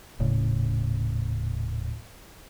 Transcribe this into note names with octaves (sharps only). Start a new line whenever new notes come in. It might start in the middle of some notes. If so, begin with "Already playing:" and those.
D#1 A2 C#3